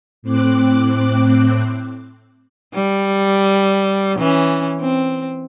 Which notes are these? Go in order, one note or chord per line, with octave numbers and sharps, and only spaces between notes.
A2 C4 D6 F#6
G3
E3 C#4
C4